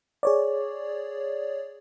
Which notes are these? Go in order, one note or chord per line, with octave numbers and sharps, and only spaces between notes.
G#4 C#5 D5